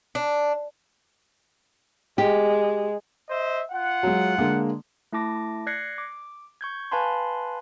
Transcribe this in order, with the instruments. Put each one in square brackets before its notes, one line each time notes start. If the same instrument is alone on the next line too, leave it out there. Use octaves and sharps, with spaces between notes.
[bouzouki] D4
[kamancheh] G#3 [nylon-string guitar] G4
[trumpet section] C5 D#5 E5
F4 F#5
[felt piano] F#3 G#3
D3 G#3 A#3
[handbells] A3 E4 A5 D6 A#6
D5 F#6 G#6 A#6 C7 C#7
D6
C#6 G6 G#6
B4 F5 G#5 A5 B5 C6